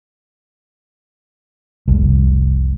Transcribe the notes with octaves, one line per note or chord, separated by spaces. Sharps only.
F1 C2